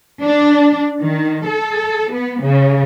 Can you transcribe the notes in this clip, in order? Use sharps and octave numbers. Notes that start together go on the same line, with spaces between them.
D4
D#3
A4
B3
C#3